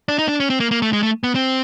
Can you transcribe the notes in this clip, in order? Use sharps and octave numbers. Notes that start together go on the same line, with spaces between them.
D4
D#4
D4
C#4
C4
A#3
A#3
A3
G#3
A3
B3
C4